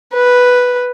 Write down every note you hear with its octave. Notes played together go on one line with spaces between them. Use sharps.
B4